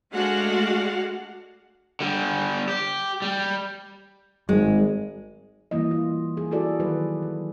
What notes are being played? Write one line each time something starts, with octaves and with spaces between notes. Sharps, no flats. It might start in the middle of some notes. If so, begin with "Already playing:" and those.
G#3 A3 D4 F#4 F5 F#5
D3 G3
G4
G3
G#1 G#3
E3 G3 A#3 E4 D#5
F4
G#4
E4 F#4 G#4 A4 D5
D#3 F#3 B4
F#3